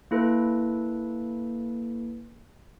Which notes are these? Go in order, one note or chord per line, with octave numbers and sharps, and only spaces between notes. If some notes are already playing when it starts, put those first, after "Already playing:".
A#3 E4 A4 B4